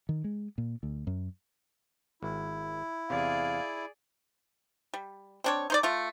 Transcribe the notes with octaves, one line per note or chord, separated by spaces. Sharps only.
D#3
G#3
A#2
D2
F#2
G#1 E4
E2 C3 G#4 D5 F5
G3
C4 D4 C#5
D#4 C5 D5
A3 F4